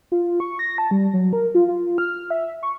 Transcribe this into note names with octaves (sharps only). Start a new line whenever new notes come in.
F4
C#6
A#6
A5
G3
F#3
A#4
F4
F4
F6
E5
C#6